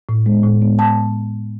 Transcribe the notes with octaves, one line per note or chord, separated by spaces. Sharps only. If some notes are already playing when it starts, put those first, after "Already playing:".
A2
G#3 B3
A2
G#3 B3
A2 A5